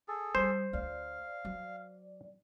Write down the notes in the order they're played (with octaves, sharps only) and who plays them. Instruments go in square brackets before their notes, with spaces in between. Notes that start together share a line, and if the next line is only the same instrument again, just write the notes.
[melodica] G#4 A4
[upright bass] G3 [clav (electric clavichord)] C5
[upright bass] D2 [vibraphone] D5 [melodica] F5
[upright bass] F#3